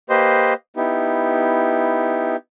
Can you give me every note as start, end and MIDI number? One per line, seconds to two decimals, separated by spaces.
0.10 0.54 58
0.10 0.54 67
0.10 0.54 71
0.10 0.54 72
0.10 0.54 75
0.10 0.54 84
0.76 2.36 59
0.76 2.36 63
0.76 2.36 64
0.76 2.36 67